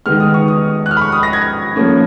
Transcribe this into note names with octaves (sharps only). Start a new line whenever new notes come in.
D#3 G#3 B3 F6
D#6
C#6
D#6
F#6
F6
B5
C#6
D#6
A#6
G#6
F3 A#3 C#4